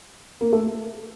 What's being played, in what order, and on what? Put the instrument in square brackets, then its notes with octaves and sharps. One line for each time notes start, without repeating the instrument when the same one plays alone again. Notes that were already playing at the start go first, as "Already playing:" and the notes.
[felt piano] A#3
A3